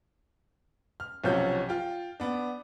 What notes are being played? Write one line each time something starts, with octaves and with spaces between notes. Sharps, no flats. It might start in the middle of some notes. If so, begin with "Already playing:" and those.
F6
B1 C3 F3 C#4 F#4 G6
F4 G5
B3 D4